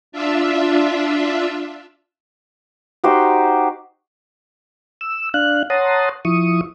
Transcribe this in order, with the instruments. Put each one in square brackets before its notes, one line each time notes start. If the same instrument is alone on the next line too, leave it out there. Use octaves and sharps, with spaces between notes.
[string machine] D4 F4 E5
[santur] D#4 F#4 G4 C5
[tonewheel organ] E6
D4 F5 F#6
C#5 F#5 A5 A#5 C6 D#6
F3 E4 C#6 D#6